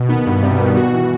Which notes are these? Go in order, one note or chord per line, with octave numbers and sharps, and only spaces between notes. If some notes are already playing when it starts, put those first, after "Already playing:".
Already playing: B2
D#3 B3
G2
C3 G3
B2 D#3
F#4
E3